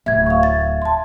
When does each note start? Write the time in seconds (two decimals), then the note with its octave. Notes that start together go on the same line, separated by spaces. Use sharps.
0.06 D1 E5 G#6
0.26 F5 C#6
0.43 A6
0.82 A5 C6